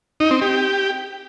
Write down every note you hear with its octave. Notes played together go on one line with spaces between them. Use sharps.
D#4
C4
G4